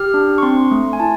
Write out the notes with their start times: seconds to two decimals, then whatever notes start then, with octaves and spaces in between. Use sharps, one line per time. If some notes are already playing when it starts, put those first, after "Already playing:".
Already playing: G4 F6
0.14 D4
0.38 C#6
0.42 C4 C6
0.71 A3
0.93 G#5
1.00 E4 A5